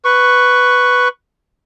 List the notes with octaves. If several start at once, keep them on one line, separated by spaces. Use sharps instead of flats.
B4 C#6